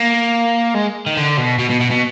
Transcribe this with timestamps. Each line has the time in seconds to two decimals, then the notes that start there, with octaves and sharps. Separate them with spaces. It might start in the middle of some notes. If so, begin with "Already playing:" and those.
Already playing: A#3
0.75 G#3
1.07 D#3
1.17 D3
1.38 B2
1.59 B2
1.70 B2
1.80 B2
1.91 B2